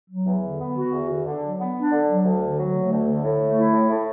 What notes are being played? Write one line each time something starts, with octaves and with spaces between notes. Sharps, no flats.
F#3
E2
D3
B3
F#4
E2
D3
D3
F#3
B3
D4
D3
F#3
D2
D3
F#3
A3
D2
D3
A2
A3
E4
A2
A2